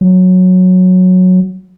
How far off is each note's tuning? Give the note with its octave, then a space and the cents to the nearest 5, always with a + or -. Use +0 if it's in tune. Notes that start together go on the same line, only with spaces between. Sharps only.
F#3 -10